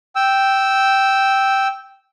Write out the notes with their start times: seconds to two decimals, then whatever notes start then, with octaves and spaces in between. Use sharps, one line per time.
0.16 G5 E6